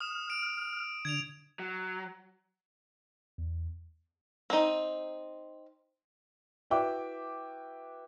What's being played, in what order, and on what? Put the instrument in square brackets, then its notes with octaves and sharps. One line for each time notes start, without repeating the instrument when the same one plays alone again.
[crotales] D#6 E7 [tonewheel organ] F6
[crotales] D7
[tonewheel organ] D3 [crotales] G#6 D7 F7
[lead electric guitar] F#3
[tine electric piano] E2
[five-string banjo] C4 D#4
[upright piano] E4 F#4 B4 E5 G5 D6